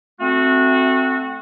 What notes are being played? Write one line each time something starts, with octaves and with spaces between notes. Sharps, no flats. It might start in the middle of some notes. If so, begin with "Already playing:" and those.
A3 C4 F#4